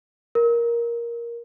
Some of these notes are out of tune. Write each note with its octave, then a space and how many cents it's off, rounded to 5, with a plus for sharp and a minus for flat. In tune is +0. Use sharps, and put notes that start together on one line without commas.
A#4 +10